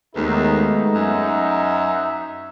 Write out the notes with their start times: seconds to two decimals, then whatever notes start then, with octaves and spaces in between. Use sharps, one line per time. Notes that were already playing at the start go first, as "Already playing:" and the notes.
0.16 D#2 G#3 A3 B3 D#4
0.95 F#2 E5